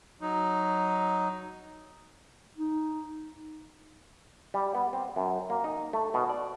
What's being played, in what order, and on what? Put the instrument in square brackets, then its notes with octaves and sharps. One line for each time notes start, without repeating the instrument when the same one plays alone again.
[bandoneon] F#3 D#4
[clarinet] D#4
[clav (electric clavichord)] G3
B3
C4
F#2
A#3
D#4
A3
B2
D5